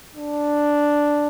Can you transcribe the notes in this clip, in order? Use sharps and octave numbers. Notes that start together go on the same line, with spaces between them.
D4